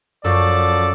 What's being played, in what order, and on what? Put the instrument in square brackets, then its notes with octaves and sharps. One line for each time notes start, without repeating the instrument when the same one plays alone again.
[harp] F#2 [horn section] F3 A4 D5